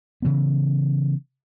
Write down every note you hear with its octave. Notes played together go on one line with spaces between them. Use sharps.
C#3 E3 B3